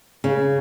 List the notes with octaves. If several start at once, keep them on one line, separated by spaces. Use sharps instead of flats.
C#3